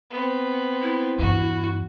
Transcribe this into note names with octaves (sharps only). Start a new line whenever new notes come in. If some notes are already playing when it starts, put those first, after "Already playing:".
B3 C4
E4
E2 G2 F#4